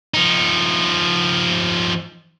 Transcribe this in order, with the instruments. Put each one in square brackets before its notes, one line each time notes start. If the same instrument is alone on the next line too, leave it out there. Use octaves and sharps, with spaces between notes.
[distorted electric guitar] F3 D#4